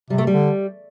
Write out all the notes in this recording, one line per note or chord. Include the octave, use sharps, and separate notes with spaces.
C3 G3
A3
G3
D3